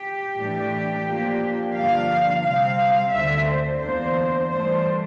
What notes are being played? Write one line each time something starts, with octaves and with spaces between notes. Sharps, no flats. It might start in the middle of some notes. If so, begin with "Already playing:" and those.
Already playing: G4
A2 E3 A3 D4
A#2 F3 A#3 D4
G2 D3 F3 A#3 D4 F5
C3 G3 C4 F5
D2 D3 A3 C4 E5
C5
E2 E3 A#3 D4 C5
G2 E3 A3 D4 C5